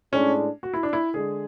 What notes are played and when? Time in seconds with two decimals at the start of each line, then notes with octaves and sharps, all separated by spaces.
0.13 A2 G#3 C#4 D4
0.63 F#4
0.74 E4
0.83 D4
0.93 E4
1.14 D3 G#3 G#4